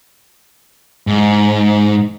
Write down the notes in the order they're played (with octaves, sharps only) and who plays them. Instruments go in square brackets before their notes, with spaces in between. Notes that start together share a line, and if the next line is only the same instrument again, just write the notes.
[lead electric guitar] G#2